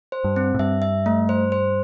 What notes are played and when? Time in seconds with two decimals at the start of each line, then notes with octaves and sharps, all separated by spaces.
0.12 C5
0.24 G2
0.36 C4
0.54 A2
0.59 G2 E5
0.82 E5
1.06 A3
1.29 C5
1.52 C5